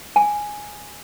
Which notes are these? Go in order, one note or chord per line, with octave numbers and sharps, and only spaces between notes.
G#5